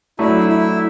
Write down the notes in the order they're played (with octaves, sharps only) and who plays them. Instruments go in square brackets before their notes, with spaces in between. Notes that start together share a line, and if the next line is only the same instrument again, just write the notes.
[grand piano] F#3 A3 D4 [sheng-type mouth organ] E4
[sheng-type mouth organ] E4